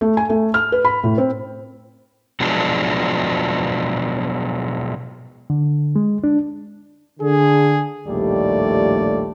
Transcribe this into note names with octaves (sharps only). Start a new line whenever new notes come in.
A3
G#5
A3
F6
B4
B5
A2
C4
B2 F3 F#3 G#3 D4
D3
G#3
D4
D3 G#4
A#1 D#2 A2 G3 A3 D5